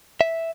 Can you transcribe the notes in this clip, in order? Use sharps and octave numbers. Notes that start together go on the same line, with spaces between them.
E5